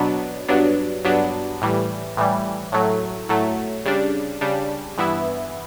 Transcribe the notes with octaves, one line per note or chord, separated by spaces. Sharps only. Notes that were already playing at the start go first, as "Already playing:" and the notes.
Already playing: B2 F#3 B3 D4
G2 F#3 B3 D4
G2 F#3 B3 D4
A2 E3 G3
A2 E3 G3
A2 F#3 A3
A2 F#3 A3
C#3 G3 D4
C#3 G3 D4
G2 E3 B3 E4